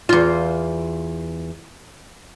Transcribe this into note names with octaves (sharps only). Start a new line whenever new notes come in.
E2 F4